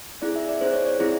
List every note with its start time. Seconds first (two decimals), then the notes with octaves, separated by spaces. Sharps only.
0.22 C4 E4 G#4 D5
0.36 E5
0.48 D5
0.61 C4 E4 G#4 C5
0.73 C#5
0.86 D5
0.99 C4 E4 G#4